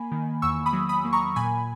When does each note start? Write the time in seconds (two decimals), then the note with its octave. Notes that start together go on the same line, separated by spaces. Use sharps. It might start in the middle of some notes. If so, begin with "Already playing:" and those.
Already playing: A#3 G#5 B5
0.12 D#3
0.42 E2 C#6 E6
0.66 B5 D#6
0.73 F#3
0.89 B5 D#6
1.05 A#3
1.13 A#5 C#6
1.36 A#2 G#5 B5